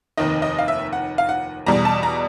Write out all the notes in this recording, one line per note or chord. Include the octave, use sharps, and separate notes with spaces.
F1 D#2 D#3 D#5
D#5
F5
E5
F#5
F5
F#5
E2 B2 G3 A#5
A5
A#5